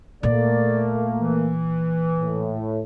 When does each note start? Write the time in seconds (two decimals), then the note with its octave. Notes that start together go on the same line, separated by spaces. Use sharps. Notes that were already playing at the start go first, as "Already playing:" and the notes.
0.23 A#2 A3 A#3 D5
1.20 E3
2.21 A2